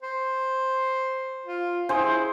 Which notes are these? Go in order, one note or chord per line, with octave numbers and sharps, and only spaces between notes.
C5
F4
E4 G#4 C5